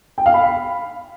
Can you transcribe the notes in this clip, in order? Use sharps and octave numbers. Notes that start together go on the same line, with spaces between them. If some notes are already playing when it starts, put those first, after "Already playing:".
G5
F5
B5